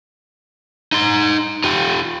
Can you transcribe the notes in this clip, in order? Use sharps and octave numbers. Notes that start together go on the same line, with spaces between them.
D#4 C6
F4 G4